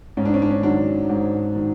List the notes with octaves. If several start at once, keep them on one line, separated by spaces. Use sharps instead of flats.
G#2 C#4
D4
C#4
D4
C#4
D#3 F#3 D4
G#2
D#3